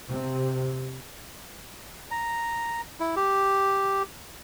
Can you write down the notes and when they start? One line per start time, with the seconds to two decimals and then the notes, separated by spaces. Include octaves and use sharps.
0.11 C3
2.11 A#5
3.00 E4
3.16 G4